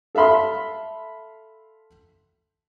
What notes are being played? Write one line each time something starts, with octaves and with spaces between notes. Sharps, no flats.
A4 E5 F5 B5 C6